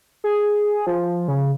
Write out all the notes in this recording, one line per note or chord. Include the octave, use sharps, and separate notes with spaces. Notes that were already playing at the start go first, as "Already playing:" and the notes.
G#4
F3
C#3